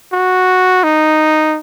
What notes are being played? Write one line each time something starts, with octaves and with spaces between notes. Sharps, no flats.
F#4
D#4